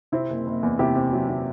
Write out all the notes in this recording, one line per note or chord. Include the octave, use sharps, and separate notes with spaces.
C3 C4 E4
F#1
F#1
E2
C3 E4 G4
C3
F#3
C3